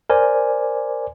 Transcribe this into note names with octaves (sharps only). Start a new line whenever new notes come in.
A#4 C5 D5 G#5